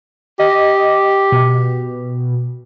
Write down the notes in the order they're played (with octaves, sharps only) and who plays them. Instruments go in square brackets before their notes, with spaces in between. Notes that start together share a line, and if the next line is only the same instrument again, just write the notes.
[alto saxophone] G4 [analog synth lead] D#5
[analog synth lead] B2